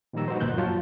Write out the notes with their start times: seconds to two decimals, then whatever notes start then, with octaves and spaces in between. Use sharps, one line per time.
0.13 A#2 D#3 F3 G3 A#5 E6
0.28 D#4 F#4 B4 C5
0.40 C#2 A#2 F3 F#6 G6
0.57 F#2 F#3 F4 C#5 A5